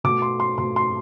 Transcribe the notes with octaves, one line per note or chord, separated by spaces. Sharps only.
B2 A3 D6
C6
C6
B2 A3 C6
C6